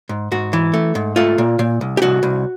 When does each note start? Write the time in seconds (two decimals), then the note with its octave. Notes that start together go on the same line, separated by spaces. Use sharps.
0.09 G#2
0.32 G#2 F#4
0.53 E3
0.74 A3
0.95 G#2
1.16 A3 F4
1.38 A#2
1.59 A#2
1.81 C2
1.97 G4
2.02 C2 F#4
2.23 C2